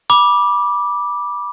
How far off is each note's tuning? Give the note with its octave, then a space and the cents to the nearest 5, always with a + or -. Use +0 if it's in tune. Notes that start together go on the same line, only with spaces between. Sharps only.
B5 -20 D6 +0